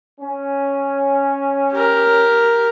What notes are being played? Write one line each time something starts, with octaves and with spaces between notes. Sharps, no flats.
C#4
G4 A#4